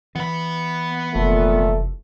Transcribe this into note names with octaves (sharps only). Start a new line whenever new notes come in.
E3 B3 B5
F1 A#2 F3 A3